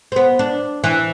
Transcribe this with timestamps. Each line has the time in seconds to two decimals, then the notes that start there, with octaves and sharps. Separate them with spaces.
0.12 C4
0.16 B3
0.39 D4
0.84 E3